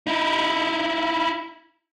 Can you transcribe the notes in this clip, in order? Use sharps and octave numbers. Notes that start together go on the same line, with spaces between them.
D#4 E4